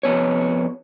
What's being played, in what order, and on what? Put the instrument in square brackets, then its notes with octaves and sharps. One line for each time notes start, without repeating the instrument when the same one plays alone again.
[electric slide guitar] F2 B3 C#5